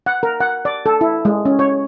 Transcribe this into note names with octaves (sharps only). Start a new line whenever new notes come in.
F#5
A#4
F#5
D5
A4
E4
G#3
C#4
C#5